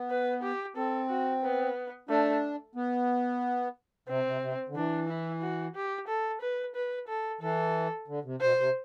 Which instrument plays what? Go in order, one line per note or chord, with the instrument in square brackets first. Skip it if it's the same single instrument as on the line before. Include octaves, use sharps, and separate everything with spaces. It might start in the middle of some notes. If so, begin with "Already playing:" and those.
Already playing: [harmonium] B3
[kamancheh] B4
G4
[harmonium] C4 [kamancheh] A4
[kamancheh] F#4
B3
[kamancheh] A3 [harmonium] D4
[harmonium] B3
[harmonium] C3 [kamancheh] C4
[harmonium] C3
C3
D3
[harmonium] E3 [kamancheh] D4
[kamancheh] E4
F#4
G4
A4
B4
B4
A4
[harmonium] E3 [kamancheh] A4
[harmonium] D3
C3
[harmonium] B2 [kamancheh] C5
[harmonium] C3